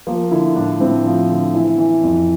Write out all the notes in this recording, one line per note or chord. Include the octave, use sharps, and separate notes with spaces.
F3 A#3
D3 E4
A2 D4
A2 C4
F3
D3
E3 E4
E3
F2